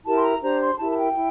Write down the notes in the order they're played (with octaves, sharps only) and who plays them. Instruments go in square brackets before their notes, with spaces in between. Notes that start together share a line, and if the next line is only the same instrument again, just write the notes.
[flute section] E4 G4 A#4 A5
C6
A#5
D4 G4 C5 A#5
C6
E4 G4 A#4 A5
A5
G5
E4